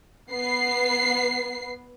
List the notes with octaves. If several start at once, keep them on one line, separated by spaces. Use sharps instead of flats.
B3 C7